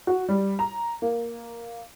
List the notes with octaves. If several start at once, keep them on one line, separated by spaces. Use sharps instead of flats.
F#4
G3
A#5
A#3